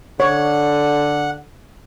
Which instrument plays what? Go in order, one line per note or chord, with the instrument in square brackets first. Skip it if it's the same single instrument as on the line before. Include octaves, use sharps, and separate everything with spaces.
[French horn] D3 [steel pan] C#5 [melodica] F#5